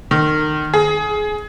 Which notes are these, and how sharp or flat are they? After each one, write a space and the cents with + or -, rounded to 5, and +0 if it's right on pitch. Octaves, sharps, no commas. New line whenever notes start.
D#3 -30
G#4 +20